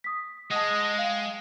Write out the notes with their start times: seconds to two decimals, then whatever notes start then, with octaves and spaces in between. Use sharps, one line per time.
0.04 D#6 B6
0.51 G#3 D#5 F#5 A5
0.98 F5 G5